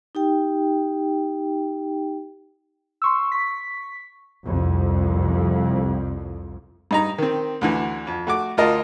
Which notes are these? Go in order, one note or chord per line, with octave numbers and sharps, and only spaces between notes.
D#4 G4 G5
C6 C#6 E6
C#6 B6
C2 F2
G2 D#4 A#5
D#3 C4
D2 D3 E3
F2
A3 F#4 D6
D2 F4 A#4 D#5 A5